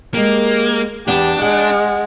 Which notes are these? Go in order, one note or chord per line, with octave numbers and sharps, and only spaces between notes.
G#3 A#3 G4
E2 B3 D4 G4
G#3 F#5